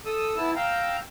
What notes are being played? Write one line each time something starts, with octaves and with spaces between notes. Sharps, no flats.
A4 D#6 E6
B3 E4 A5 E6
F5 G5 A#5 E6